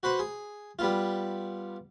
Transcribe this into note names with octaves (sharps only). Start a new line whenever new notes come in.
F#4 B4 C5
G#4
G3 B3 F4